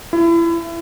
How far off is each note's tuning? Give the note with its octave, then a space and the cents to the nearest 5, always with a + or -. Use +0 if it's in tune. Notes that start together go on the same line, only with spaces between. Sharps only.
E4 +30